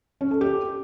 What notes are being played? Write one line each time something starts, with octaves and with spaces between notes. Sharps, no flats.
C#4
A4
G4